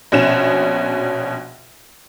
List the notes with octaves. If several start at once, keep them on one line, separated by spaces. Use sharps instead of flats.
A#1 B2 C#4 E7